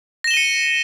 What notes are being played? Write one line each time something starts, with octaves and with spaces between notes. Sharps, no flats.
A#6 C#7 D#7 E7 G7